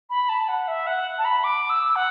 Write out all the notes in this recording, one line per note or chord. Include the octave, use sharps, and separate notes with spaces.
B5
A5
F#5
E5
F#5
A5
B5
D6
E6
F#5